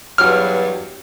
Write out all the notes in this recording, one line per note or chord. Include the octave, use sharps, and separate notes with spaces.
E2 G2 F#3 F6